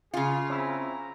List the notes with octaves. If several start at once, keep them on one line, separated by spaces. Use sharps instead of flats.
C#3 F4 G#4
C4 C#4 E4 A#5